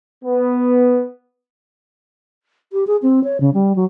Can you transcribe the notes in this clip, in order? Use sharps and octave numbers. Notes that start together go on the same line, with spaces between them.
B3
G4
G#4
C4
C#5
C#3
G3
F#3